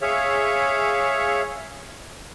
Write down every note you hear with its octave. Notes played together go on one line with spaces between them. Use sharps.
G#4 C#5 E5 F5